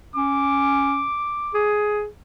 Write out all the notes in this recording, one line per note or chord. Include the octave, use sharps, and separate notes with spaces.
C#4 D6
G#4